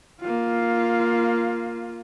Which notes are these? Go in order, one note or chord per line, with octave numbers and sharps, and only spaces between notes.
A#3 F4